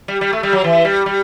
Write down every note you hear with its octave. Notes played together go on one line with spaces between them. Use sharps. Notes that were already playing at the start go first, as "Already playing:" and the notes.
G3
G3
A3
G3
F#3
E3
G3
G3